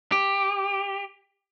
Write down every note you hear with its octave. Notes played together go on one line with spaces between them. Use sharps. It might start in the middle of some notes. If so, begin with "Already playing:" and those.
G4